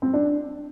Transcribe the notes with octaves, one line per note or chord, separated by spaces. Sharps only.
C4
D4